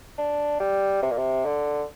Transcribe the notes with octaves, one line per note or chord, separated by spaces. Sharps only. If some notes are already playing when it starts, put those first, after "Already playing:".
D4
G3
C3
A#2
C3
D3